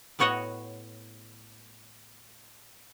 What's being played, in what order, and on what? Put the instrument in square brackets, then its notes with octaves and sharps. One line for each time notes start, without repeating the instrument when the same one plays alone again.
[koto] A2 B3 F#4 C#5 D#5 F#5